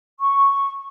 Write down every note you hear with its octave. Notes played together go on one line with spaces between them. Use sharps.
C#6